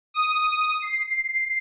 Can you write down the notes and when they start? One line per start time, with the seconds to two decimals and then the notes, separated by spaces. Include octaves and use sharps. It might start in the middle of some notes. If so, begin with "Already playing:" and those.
0.14 D#6
0.82 C7